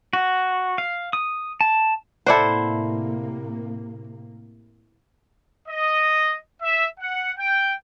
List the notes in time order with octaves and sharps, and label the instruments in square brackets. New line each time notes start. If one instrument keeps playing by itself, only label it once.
[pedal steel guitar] F#4
F5
D#6
A5
[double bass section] A2 C3 A#3 [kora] E4 C5 [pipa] A4 D5 F#5
[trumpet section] D#5
E5
F#5
G5